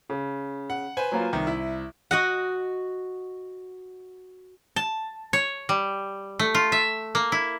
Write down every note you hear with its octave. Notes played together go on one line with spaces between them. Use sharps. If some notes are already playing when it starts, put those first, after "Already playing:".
C#3
F#5
B4 C5 G#5
F#3 A#3 F4
C2 D#3
E4
F#4 D#5 F#5
A5
C#5
G3
A3
F4
E5
A#3
E4